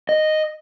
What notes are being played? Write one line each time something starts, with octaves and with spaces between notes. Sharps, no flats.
D#5